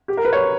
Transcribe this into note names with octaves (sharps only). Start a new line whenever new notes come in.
G4
A#4
B4
C#5